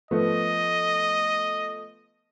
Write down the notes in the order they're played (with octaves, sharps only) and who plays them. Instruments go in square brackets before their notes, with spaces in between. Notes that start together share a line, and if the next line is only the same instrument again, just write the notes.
[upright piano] F3 A3 B3 [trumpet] D#5